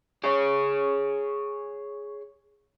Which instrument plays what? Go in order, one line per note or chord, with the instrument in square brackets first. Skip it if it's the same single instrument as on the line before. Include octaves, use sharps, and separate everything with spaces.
[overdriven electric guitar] G#4 C#5